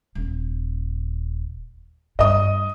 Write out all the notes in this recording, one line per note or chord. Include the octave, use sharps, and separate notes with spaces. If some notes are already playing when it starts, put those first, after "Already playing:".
D#1
G2 D#5 D#6